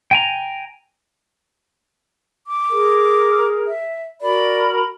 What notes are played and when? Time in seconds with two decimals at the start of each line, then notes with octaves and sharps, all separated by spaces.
0.11 G5 G#5 A#5
2.47 D6
2.71 G#4 A#4
3.67 E5
4.21 F#4 A#4 D5 B5